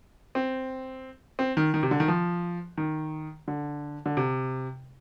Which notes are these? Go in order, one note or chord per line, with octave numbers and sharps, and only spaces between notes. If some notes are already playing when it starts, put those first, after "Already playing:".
C4
C4
D#3
D#3
C3
D3
D#3
F3
D#3
D3
D3
C3